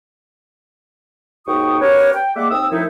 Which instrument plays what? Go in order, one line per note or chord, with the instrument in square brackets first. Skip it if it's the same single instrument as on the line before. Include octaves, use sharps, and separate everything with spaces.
[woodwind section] D#2 G#2 F#4 G5 C#6 D#6
B3 C#4 G4 A#4 B4 C#5
G5
G3 G#3 A#3 E5 F#5 D6
D#2 C4 D#6 E6
F#2 D#3 F3 A3 D#4 E4